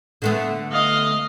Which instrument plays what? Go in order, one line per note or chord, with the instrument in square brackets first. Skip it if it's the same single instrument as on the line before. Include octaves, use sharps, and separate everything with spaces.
[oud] D3 A3 B3
[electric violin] D#5 F5